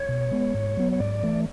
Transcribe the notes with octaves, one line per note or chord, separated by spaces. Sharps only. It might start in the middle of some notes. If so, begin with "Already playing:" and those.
Already playing: C#5
B2
G#3 B3
G#2
F#3 B3
C#5
G#2 D5
E3 A3